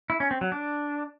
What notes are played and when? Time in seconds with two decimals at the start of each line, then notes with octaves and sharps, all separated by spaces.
0.10 E4
0.20 C#4
0.31 C4
0.41 F#3
0.52 D4